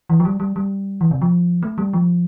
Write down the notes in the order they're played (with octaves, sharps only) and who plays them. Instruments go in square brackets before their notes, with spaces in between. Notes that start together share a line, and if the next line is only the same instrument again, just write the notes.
[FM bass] E3
F3
G3
G3
G3
E3
C3
F3
A3
G3
F3